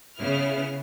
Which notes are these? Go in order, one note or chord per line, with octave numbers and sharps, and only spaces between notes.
C#3 B3 E4 F6